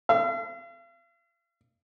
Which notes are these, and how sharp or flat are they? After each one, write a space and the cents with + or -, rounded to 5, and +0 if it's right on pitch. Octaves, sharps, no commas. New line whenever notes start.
F5 -45